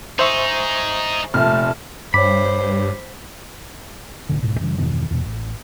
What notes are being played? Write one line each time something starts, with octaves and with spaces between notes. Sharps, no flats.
D#4 G#4 C5 E5 C#6
F1 A#2 A3 A5 F6
G2 C5 C#5 B5 D6
A1 A2 D3
D1 G#2 B2
F#2 C#3 E3 G3
E2 G2 B2 D#3
E2 B2
A1